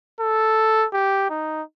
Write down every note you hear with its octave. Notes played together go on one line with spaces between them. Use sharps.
A4
G4
D#4